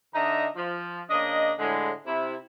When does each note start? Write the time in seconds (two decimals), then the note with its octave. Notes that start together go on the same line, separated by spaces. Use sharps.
0.14 D3 D4 D#4 D#5 E5 A#5
0.56 F3
1.10 C#3 A#3 D4 D#5
1.59 A2 D3 G#3
2.07 C3 E4